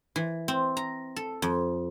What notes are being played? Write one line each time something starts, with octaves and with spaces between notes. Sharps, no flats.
E3
C4
A#5
A4
F2